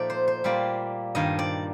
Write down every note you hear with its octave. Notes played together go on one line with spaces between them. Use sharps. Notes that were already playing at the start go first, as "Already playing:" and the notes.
Already playing: A#2 F3 A3 D#4 D5
C5
C5
A#2 G3 A#3 F4 D5
G2 D#3 A#3 D4 D#5
D5